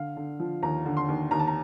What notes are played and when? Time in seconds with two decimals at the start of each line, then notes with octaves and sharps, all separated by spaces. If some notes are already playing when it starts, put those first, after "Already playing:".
Already playing: D3 F5
0.17 D3
0.40 F3
0.62 D#2 A#5
0.85 D3
0.97 C6
1.08 D#2
1.31 D#2 A#5
1.39 A5
1.47 A#5